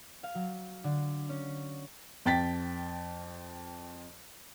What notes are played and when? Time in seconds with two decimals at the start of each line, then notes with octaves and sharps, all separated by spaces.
0.23 F5
0.35 F#3
0.84 D3
1.29 C#4
2.26 F2 G5 A6 B6